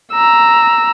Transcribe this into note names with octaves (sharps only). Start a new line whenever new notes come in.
A#5 E6